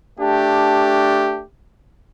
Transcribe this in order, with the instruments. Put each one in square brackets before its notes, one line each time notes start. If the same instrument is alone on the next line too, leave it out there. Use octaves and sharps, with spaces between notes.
[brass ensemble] A3 D4 G4